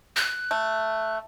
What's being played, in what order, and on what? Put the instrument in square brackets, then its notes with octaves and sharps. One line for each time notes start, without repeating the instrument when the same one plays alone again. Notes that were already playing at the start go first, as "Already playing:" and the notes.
[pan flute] F#6
[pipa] A3